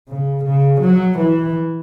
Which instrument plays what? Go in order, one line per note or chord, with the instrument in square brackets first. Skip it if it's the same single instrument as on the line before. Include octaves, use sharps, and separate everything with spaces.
[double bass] C#3
C#3
F#3
E3